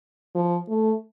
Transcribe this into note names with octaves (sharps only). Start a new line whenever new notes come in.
F3
A3